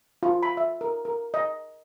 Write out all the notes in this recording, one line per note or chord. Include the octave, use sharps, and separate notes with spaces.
F4
B5
E5
A#4
A#4
D#5